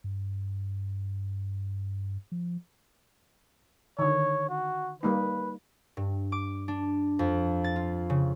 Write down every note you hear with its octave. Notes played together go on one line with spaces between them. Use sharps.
G2
F3
D3 D#3 C#5
F#4
G3 A#3 D#4 B4
G2
D6
D4
F2
A6
F4
C#3